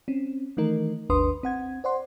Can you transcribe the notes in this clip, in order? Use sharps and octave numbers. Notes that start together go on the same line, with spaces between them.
C4 C#4
D#3 E3 A3 D#4 A#4
G#1 D#2 D4 B4 C6 D#6
C4 F#5 G#6
C5 D5 F#5 C6